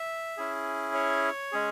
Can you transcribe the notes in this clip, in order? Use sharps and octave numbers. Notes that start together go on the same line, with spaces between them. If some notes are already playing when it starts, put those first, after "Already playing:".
Already playing: E5
C#4 E4 G#4
C#5
G#3 C#4 G#4